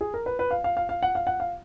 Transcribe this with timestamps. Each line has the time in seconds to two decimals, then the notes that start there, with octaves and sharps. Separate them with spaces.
0.01 G#4
0.14 A#4
0.26 B4
0.39 B4
0.51 F5
0.64 F5
0.77 F5
0.89 F5
1.03 F#5
1.15 F5
1.27 F#5
1.40 F5